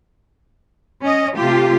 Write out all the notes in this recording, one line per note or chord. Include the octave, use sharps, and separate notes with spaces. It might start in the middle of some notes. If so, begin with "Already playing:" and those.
C#4 D#5
C3 A3 F4 G4